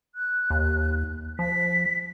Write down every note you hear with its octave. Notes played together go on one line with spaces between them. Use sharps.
F#6
D#2
F3 B6